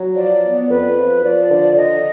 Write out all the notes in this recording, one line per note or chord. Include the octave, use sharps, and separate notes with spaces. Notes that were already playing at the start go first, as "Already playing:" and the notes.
Already playing: F#3
F3 D5
B3
F2 B4
F3
F3 D5
D3
D3 D#5